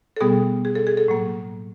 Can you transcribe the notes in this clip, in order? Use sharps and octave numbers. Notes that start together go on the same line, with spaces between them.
A4
B2 G3 B3 G#4
G#4
A4
G#4
A4
A2 F#3 A#3